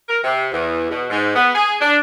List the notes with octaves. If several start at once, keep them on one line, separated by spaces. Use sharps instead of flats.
A#4
C3
E2
B2
G#2
B3
G#4
D4